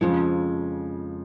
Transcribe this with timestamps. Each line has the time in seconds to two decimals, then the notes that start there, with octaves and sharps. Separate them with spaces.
0.01 F2 C#3 F3 G#3